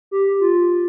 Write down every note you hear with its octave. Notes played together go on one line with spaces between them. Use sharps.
G4
F4